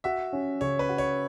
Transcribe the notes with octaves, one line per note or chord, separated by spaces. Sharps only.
F#4 E5
C#4
C#3 C#5
B4
F#4
C#5